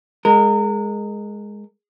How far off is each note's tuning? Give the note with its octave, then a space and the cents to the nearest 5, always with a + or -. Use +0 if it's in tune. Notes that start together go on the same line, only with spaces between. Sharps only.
G#3 +0 A#4 -25